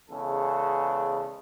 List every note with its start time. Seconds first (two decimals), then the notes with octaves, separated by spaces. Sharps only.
0.10 E2 C#3 G#3 A4